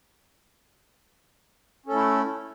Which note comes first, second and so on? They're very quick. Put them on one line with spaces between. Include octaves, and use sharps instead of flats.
C#4 A4 A3 E4